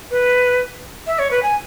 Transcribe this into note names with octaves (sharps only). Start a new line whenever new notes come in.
B4
E5
C#5
B4
G#5